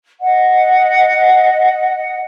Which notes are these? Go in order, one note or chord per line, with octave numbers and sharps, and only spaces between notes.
D#5 F#5